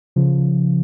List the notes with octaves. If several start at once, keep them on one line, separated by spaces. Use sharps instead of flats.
C#3 F3